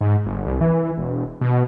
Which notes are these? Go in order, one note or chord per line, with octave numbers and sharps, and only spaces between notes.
G#2
G1
C2
E3
E1
B2